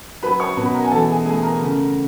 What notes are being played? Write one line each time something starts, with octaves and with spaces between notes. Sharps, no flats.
F#3 B4 B5
C#5 C#6
B2 B4 B5
A#4 A#5
G#5
E3 A4 A5
G#4 G#5
A3 G#4 G#5
A#4 A#5
C#3